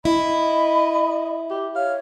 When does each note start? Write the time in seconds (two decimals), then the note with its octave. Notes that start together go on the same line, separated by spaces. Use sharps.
0.05 E4 D#5 B5
1.50 G4
1.76 C#5 F5